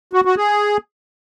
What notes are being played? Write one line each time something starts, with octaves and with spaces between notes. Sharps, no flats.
F#4
F#4
G#4